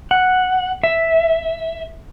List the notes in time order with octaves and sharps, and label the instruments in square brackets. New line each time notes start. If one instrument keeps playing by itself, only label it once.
[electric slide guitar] F#5
E5